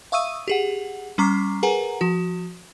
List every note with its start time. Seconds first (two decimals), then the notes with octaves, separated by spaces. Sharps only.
0.12 E5 F5 C#6 D#6 E6 D#7
0.48 G4 G#4 F#5
1.18 G3 C#4 A#5 C#6 D6 C7
1.63 G#4 A#4 B4 F#5 G#5 A#5
2.01 F3 F#4